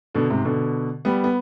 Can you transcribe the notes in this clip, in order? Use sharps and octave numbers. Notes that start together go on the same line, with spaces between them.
B2 D3
G#2 C3
B2 D3
G3 B3
B3